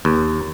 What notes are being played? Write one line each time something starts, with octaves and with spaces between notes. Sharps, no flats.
D#2